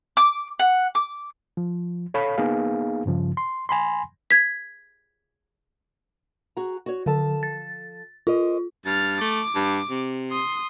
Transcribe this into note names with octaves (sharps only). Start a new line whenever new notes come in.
D6
F#5
D6
F3
A4 C#5 F5 B5
A#3 B3 D#4 G#4 F5
G2 C#3 F3
C6
G#5 B5 C6
G#6 B6
F#4 G#4 A#5
F#4 C#5
D3 F3 A4 A5
A6
F4 A#4 C5 D#5
G2 F6 A6
A3 D6
G2
C3
C6 D#6